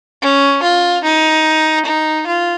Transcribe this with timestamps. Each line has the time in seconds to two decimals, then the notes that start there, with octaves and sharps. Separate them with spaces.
0.22 C#4
0.63 F4
1.04 D#4
1.85 D#4
2.27 F4